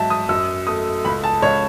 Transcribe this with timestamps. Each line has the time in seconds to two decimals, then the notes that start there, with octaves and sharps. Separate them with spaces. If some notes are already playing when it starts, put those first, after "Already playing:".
Already playing: G#2 F#3 E5 A5
0.10 D#6
0.29 F#2 E6
0.67 A3 D#6
1.05 C#2 B5
1.24 A5
1.42 C#2 C#5